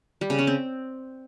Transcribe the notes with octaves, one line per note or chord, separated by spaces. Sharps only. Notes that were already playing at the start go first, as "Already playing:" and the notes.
G3
C#3
C#4
C4